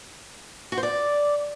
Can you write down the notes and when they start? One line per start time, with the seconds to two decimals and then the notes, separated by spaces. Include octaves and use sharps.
0.72 F#4
0.77 C5
0.83 D5